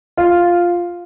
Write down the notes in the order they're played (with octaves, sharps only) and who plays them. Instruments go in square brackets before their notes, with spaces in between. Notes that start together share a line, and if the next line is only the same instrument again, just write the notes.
[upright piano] F4